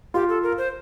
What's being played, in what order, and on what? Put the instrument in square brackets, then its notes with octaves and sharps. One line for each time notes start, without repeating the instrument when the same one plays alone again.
[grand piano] F4 [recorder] G4
[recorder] A4
A#4
C5